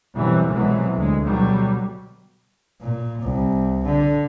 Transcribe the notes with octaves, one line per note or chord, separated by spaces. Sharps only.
F2 B2 E3 F#3 G3
C2 B2 E3 F#3 G#3
D2 G#3
B2 D3 F#3 G3
A#2
C2
D3